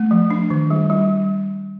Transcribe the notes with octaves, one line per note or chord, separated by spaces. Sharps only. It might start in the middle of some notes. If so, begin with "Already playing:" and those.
Already playing: A3
F3
D4
D#3
G3
G3